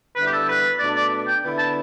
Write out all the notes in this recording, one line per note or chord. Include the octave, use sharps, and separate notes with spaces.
D3 G3 B3 E4 B4
G4
A4
B4
B2 A3 D4 D5
D5
G5
D3 B3 E4
A5